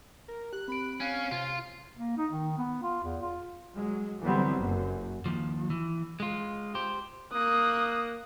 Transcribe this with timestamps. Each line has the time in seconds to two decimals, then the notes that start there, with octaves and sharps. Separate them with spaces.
0.28 A#4
0.53 G4 F#6
0.68 C4 B5 D7
1.00 C#4 F5
1.31 C3 F4
1.97 A#3
2.18 D#4
2.31 D#3
2.58 B3
2.82 F4
3.04 E2
3.22 F4
3.73 F#3 G#3
4.21 D3 E3 F#3 G3 B3 C4
4.55 F#1 F#2
5.26 D#2 F3
5.70 E3
6.20 G#3 F4
6.75 G4 C5
7.33 A#3 D#6 F#6